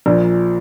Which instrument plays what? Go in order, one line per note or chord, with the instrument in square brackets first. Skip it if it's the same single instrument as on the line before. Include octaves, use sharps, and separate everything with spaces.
[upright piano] A#1 A#2 F3